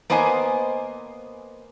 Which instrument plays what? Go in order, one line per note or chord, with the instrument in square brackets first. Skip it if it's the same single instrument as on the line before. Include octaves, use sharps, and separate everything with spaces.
[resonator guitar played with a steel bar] A#3 B3 C5 D#5 G#5